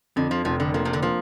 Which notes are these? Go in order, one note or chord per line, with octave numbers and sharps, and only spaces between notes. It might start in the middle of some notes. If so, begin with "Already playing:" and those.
F2 D3
F3
F1 F3
D3
F3 A#3
C3
D3
F3 A#3